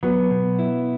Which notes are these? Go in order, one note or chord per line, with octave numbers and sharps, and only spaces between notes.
F#3 B3
B2
E4